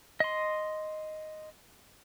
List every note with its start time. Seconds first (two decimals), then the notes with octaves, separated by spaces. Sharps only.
0.20 D#5 C6